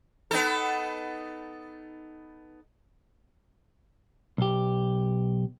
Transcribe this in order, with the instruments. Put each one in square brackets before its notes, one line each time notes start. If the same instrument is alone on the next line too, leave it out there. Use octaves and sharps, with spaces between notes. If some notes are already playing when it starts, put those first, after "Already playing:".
[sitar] B3 D#4 A4
[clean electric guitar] B1 G4